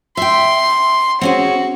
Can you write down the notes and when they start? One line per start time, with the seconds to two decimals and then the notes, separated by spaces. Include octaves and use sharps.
0.17 E5 G5 C6
1.21 C4 C#4 F#4 G#4